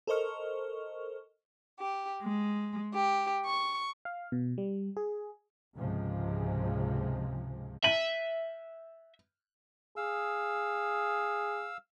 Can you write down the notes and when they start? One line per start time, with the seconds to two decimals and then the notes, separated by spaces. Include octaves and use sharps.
0.07 A4 A#4 C5 D#5 C#6 F6
1.78 G4
2.23 G#3
2.94 G4
3.45 C#6
4.05 F5
4.32 B2
4.58 G3
4.97 G#4
5.76 C#2 G#2 C3 F3 G#3
7.84 E5 D#7 F#7
9.97 G#4 F5 E6